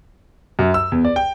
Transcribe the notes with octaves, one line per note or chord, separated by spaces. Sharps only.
F#2
E6
E2
D5
G5